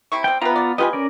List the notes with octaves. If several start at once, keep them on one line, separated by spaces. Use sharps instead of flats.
C3 E4 C#6
F3 G3 C4 G5
C3 B3 F4 B4 A#5
D5
B3 F4 G4 B4 D#5 G#5
C#4 A#4 D5